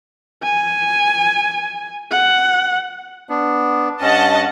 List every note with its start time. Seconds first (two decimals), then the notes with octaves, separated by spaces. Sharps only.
0.43 G#5
2.12 F#5
3.29 B3 D4
4.01 G2 C#4 D#5 F#5 A5